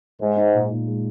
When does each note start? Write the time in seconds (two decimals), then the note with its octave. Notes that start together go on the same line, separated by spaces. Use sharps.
0.19 G#2 G#3
0.36 D#4
0.54 A#2
0.71 A#2
0.88 G#3